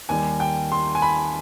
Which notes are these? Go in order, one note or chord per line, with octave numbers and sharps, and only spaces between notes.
D#2 D#3 G3 G#5
G5
C6
G#5
B5